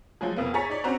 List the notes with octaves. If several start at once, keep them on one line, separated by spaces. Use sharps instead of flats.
F3 F#3 G#3 G#4
C2 F2 A#3 B3
G#4 C#5 A#5 A6 B6 C#7
D#4 C#5 D5
C4 C#4 F#4 C5 A#5